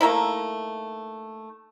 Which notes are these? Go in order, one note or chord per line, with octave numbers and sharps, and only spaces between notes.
A3 A#3 D#4 E4